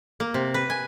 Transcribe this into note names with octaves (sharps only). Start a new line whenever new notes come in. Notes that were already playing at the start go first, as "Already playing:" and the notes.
A#3
C3
B4
G#5